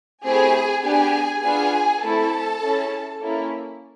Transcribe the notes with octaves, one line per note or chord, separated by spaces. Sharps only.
A3 C4 E4 G4 G#4 G#5
B3 D4 G4 G#4 G#5
B3 D4 F4 G#4 G#5
A3 C4 E4 A4 A5
C#4 E4 G#4
A#3 C#4 E4 A4